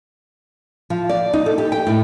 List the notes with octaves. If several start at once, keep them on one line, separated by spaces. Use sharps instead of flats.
F3
D5
D#4
A4
G4
G5
A2